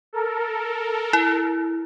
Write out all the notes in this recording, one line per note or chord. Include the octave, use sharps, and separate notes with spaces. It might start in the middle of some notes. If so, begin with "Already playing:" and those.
A4 A#4
E4